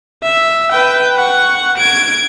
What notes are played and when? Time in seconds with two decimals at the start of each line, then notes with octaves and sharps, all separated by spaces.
0.23 E5
0.72 B4 G5
1.16 F#5 C#6
1.77 G#6 D7